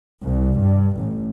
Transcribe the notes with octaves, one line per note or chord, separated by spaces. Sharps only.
C2
G2
A1